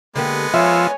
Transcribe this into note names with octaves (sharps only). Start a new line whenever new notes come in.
D3 G#3 A#3 B3 G4
F3 F4 C#5 E5 G#5 E6